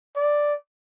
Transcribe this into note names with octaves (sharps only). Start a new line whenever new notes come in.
D5